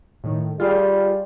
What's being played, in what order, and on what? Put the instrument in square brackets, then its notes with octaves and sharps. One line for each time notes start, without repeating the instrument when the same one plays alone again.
[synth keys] A2 D#3
[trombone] G3 [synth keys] F4 G#4